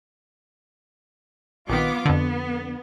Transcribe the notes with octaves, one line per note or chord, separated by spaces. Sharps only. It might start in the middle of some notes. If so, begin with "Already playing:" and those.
A#1 D#3 B3 F4 D6
F2 D3 B3